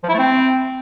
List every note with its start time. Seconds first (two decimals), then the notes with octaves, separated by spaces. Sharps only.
0.03 F3
0.09 E4
0.14 A3
0.19 C4